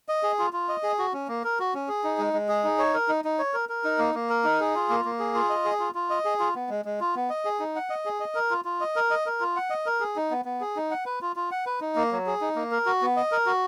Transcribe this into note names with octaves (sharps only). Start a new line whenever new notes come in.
D#5
G#4
F4
F4
D#5
G#4
F#4
C#4
A#3
A#4
F#4
C#4
G#4
D#4
G#3
G#3
G#4
D#4
C#5
A#4
D#4
D#4
C#5
A#4
A#4
D#4
A#3
A#3
A#4
D#4
G#4
F4
A#3
A#3
G#4
F4
D#5
G#4
F4
F4
D#5
G#4
F4
B3
G#3
G#3
F4
B3
D#5
G#4
D#4
F#5
D#5
G#4
D#5
A#4
F4
F4
D#5
A#4
D#5
A#4
F4
F#5
D#5
A#4
G#4
D#4
B3
B3
G#4
D#4
F#5
B4
F4
F4
F#5
B4
D#4
A#3
F#3
G#4
D#4
A#3
A#4
F#4
B3
D#5
A#4
F#4